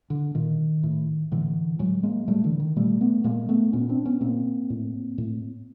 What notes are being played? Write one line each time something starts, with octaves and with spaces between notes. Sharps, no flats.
D3
A#2 D#3
A2
A2 D3 E3
A2 F#3 G#3
G#3 A#3
A2 G3 A3
D3 E3
D#3
A#2 G3 A3
A3 B3
A#2 G#3 A#3
A3 B3
A#2 B3 C#4
C4 D4
B3 C#4
A#2 A#3 C4
A2
A2